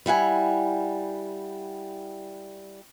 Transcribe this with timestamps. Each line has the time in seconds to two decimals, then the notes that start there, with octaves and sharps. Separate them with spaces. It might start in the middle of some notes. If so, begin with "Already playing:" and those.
0.06 G3 E4 F#5 G#5